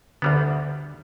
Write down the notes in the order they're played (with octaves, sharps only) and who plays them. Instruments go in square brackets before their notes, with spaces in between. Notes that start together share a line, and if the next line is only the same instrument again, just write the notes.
[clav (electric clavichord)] D2 G3 B3 [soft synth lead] D3